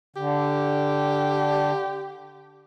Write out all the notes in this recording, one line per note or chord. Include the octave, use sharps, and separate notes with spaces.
D3 G4